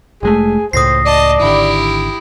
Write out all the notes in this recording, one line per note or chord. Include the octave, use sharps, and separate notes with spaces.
F1 G#3 A3 G#4
C#2 A2 C5 D#6 A#6 C7
D5 D#5 A5
G#1 D3 E4 G4